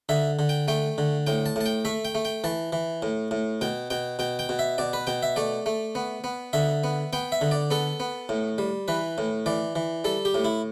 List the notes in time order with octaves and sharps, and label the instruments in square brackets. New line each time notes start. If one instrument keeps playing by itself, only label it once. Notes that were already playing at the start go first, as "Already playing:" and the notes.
[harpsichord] D3 E5
D3
G5
A3 G5
D3
A2 G5
A5
A2 A5
G5
A3 E5
G5
A3
G5
E3 A5
E3
A2
A2
B2 G5
B2 G5
B2 G5
G5
B2
E5
B2 D5
B4
B2 G5
E5
A3 D5
A3
B3
B3
D3 E5
B3
B3 G5
E5
D3
D5
B3 A4
B3
A2
G3
E3 B4
A2
E3 D5
E3
G3 A4
G4
A2
E4